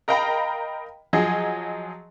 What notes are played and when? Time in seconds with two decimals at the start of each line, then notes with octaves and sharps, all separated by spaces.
0.08 A#4 D#5 F5 G5 A#5 B5
1.13 F3 F#3 G#4 D#5